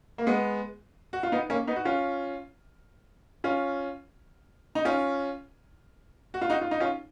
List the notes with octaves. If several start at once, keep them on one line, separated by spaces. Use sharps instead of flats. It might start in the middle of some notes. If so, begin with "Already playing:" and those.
A#3
G#3 B3
F#4
F4
B3 D#4
A#3 C#4
B3 D#4
F#4
C#4 F4
C#4 F4
D#4
C#4 F4
F#4
F4
D#4 F#4
F4
D#4
C#4 F4